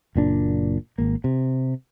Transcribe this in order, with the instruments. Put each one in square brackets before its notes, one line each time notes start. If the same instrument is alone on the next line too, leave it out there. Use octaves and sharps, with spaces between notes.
[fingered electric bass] F#1 A#2 D4
G#1 A#3
C3